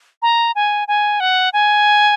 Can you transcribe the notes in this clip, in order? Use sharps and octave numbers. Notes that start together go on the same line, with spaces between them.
A#5
G#5
G#5
F#5
G#5